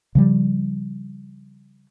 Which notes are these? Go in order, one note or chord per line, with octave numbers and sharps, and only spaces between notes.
C#3 F3 G3